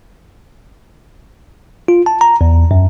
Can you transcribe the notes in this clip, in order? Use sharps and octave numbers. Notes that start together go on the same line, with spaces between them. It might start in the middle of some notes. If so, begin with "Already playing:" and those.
F4
A5
A#5
E2
F#2